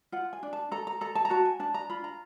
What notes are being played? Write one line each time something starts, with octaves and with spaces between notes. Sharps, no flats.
F4 F#5
G#5
D4
A5
A4 A#5
A#5
A4 A#5
A5
A#5
F#4 A5
G#5
D4 A5
A#5
F4 B5
A#5